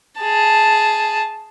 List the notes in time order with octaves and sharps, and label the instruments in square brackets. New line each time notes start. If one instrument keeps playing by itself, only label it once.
[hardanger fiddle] G#4 A5